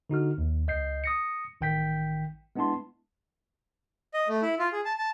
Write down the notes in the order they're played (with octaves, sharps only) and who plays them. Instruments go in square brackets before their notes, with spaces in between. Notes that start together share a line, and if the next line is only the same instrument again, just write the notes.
[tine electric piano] D3 D#4 F#4 F6
D#2
C#2 D#5 G6 C7
D#6 A#6 C#7
A1 D#3 G5 G6 B6
G#3 B3 D4 E4 A5 C6
[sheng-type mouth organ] D#5
A3
E4
F4
G#4
A5
A5